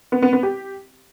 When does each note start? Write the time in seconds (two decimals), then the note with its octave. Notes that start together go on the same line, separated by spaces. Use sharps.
0.12 B3
0.22 B3
0.33 B3
0.43 G4